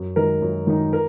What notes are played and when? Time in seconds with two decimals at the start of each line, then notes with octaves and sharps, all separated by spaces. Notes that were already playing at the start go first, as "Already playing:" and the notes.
Already playing: F#2
0.16 D#3 G#3 D#4 A#4
0.42 F#2
0.67 D#3 G#3 D#4
0.93 A#4